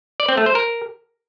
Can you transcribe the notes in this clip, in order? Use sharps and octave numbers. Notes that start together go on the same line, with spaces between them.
D5
C4
A3
C5
A#4